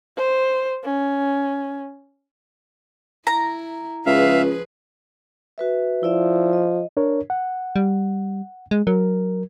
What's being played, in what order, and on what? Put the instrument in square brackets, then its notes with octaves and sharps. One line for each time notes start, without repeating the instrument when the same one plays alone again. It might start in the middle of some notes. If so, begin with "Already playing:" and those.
[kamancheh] C5
C#4
[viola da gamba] E4 [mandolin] A#5
[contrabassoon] C#2 [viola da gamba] F3 G#4 B4 [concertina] E5 F5
[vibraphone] F#4 B4 E5
[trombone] F3 [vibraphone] E4 D5 E5
[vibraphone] D#5
[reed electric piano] D4 A#4 C#5
F#5
[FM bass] G3
G#3
[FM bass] F#3 [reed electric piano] A#4